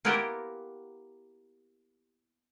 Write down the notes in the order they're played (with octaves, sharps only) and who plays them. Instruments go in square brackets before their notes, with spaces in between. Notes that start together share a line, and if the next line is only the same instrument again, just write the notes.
[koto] A#3 B3 E4 F4 G4 A#4